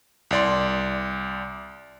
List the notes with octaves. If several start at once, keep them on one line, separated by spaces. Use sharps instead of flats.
C2 D5 C6